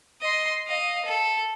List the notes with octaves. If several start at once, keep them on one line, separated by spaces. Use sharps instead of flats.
D#5 C6
D#5 F5
A4